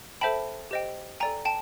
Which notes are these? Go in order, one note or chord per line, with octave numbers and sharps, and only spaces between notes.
A4 C5 E5 G5 A5 B5
G4 C5 D#5 G5
A4 D5 G5 G#5 A#5
G5 A5